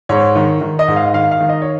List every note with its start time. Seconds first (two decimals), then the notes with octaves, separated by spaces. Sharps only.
0.09 G#2 C#5
0.36 D#3
0.61 D#3
0.79 D#5
0.88 G#2
0.96 F5
1.14 D#3 F5
1.31 F5
1.40 D#3
1.49 D#5
1.62 C#5